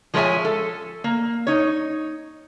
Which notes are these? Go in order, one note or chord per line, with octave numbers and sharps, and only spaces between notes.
F3 G#3 A4 C#5 E5 G#5
A4
A#3
D#4 C#5